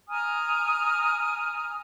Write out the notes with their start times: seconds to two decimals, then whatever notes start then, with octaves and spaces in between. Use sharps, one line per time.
0.09 G#5 A#5 D#6 F6